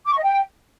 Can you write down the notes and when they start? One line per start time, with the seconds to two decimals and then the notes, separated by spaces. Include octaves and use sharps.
0.06 D6
0.11 C#6
0.17 D#5
0.23 G5